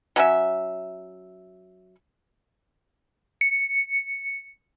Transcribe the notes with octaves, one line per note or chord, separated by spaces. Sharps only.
F#3 C#4 E5
C#7